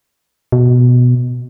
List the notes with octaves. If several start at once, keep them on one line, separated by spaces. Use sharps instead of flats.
B2